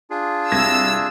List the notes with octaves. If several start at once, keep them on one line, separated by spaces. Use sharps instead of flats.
D4 F4 G#4
C2 E6 G#6 A#6